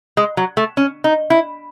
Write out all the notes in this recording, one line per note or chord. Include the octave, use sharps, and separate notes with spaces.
G#3
F#3
A3
C#4
D#4
E4